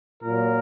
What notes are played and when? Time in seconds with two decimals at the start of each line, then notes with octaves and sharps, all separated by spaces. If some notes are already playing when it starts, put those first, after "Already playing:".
0.24 A#2 A#4
0.29 F#3